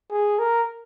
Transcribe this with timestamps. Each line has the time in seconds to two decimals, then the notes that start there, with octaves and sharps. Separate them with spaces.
0.11 G#4
0.39 A#4